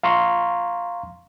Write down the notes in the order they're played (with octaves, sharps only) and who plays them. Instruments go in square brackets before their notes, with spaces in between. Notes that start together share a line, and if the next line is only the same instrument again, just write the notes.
[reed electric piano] F5 A#5 C6 C#6